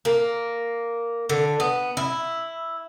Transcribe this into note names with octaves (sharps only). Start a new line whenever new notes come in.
A#3
D3
B3
E4